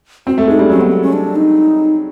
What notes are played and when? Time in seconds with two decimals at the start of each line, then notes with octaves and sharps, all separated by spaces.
0.27 C4 F#4
0.38 A3
0.48 G#3 D#4
0.59 G3 D4
0.69 F#3 C#4
0.81 B3
0.92 C4
1.02 C#4
1.13 D4
1.36 D#4